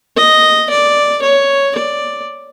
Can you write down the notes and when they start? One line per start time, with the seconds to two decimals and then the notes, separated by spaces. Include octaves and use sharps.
0.17 D#5
0.70 D5
1.23 C#5
1.76 D5